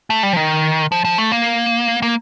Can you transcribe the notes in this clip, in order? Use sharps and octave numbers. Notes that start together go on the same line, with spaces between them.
A3
G3
F3
D#3
F3
F3
A3
A#3
A#3